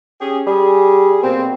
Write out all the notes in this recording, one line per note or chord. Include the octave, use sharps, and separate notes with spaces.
C#4 G4 G#4
G3 G#4
B2 A#3 C4